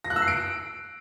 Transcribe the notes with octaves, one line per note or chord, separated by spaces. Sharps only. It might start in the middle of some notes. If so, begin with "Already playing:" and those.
A#6
F#6
E6
C7
D7